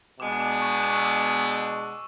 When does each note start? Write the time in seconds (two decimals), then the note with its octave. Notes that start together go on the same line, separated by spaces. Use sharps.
0.20 B2 G#3 B3 D4 D6
0.40 D6
0.62 C#6
0.83 D6
0.95 E6
1.05 D6